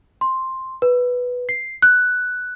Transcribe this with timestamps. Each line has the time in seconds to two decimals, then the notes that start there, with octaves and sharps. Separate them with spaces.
0.21 C6
0.82 B4
1.49 C7
1.82 F#6